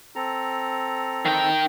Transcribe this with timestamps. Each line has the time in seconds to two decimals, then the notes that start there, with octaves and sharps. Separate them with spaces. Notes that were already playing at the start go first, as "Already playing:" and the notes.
0.16 C4 A4 A#5
1.25 D#3 G5